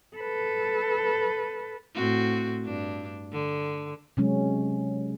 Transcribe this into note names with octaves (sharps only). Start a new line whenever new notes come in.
A4 B4
A2 C4 F#4
G2 D4
D3
C3 F#3 G#3 C#4